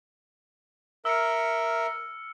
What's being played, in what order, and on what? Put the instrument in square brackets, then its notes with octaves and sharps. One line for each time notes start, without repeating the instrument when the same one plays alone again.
[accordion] A#4 E5 [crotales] E6 F6 C#7